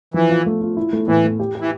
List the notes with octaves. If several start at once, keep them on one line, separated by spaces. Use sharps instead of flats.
E3 F3
F4
A3
F4
E4
A3
A2 E3
A3
G4
G4
E3